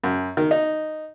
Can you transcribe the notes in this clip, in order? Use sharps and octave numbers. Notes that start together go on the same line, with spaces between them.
F#2
D#3
D#4